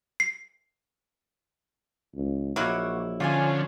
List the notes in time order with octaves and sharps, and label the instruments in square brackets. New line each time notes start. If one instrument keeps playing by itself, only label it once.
[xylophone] C7
[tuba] C#2
[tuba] A#1 [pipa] F#3 G#3 E4 [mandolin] A#3 F#5 C#6
[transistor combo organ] D3 F3 C#4 [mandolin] F4 C#5 G#5